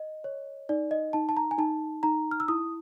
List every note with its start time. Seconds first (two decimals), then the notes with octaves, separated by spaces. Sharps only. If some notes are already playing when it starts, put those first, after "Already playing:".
Already playing: D#5
0.24 C#5
0.69 D#4 D5
0.91 D#5
1.13 D#4 A5
1.29 A5
1.37 A#5
1.51 G#5
1.58 D#4 A5
2.03 D#4 A#5
2.31 F6
2.40 E6
2.48 E4 D#6